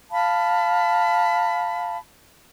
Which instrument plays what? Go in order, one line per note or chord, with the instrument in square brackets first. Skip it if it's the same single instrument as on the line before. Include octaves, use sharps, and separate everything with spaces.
[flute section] F5 A5 B5